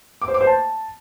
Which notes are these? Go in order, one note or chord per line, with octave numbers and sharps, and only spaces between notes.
D6
C5
D6
C5
A5